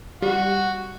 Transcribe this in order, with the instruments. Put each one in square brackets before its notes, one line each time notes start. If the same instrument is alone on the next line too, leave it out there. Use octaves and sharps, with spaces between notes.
[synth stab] G3 [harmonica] F#4